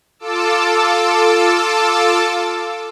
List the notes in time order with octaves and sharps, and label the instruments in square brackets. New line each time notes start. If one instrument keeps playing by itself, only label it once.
[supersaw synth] F4 A4 A5 D6 E6